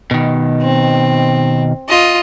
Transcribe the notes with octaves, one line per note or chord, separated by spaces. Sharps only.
B2 D#3
C4
F4 D#5